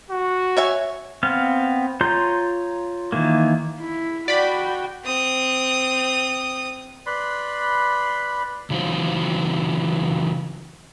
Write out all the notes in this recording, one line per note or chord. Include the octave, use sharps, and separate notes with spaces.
F#4
C#5 E5 G#5
B3 C4 F5 F6
F4 C#5 A#5 C6 G6
D#3 E3 A#3
E4
F#4 D5 G5 B5
C4 D#6
B4 D5 B5 C6
C#3 E3 F#3 D#4 F4 C5